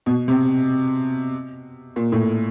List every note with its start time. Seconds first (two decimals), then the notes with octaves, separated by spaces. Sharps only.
0.06 B2
0.28 C3
1.96 A#2
2.12 A2